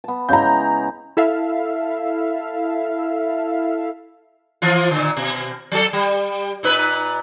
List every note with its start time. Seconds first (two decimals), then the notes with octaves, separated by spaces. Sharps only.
0.04 B3 A5
0.29 C#3 G#3 E4 A#5 G6
1.17 E4 A4 E5 F5
4.62 E3 F3 F4
4.91 A#2 D3
5.17 B2
5.72 F#3 A4
5.93 G3
6.63 A#2 D#4 B4